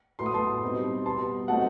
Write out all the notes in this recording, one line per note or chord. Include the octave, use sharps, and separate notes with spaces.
A2 F#3 B3 C6
D#6
A5 C6
B2 G3 C4 D#4
B2 G3 B3 A5 C6
F#3 A3 C4 D#4 F#5 A5